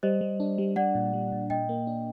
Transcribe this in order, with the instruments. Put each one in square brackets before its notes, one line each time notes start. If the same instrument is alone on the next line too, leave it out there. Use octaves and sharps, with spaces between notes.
[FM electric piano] G3 [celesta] C5 D#5
[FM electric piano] G3
D4
G3
[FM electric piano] G3 [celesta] D5 F#5
[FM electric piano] A#2
G3
A#2
[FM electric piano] A#2 [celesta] D#5 G5
[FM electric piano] A#3
D4